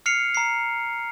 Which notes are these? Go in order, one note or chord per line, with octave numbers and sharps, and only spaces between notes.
F6 C7 C#7 F7
A#5 C7